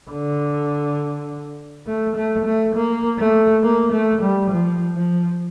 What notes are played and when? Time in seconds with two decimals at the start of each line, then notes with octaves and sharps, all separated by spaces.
0.10 D3
1.86 A3
2.16 A3
2.45 A3
2.75 A#3
3.18 A3
3.63 A#3
3.92 A3
4.21 G3
4.51 F3
4.95 F3